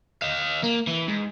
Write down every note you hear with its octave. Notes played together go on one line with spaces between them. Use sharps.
D#5 F5
A#3
E3
G#2